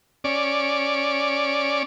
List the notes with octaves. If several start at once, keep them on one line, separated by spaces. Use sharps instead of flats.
C#4 D5